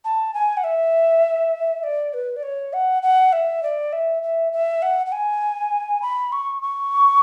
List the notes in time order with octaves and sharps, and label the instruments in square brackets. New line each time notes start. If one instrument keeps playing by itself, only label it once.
[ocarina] A5
G#5
F#5
E5
D5
B4
D5
C#5
F#5
F#5
E5
D5
E5
E5
E5
F#5
F#5
G#5
B5
C#6
C#6